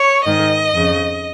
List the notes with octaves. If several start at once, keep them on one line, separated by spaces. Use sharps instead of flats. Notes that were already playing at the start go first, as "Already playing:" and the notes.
Already playing: C#5
G#2 D#3 D#5
F2 C#3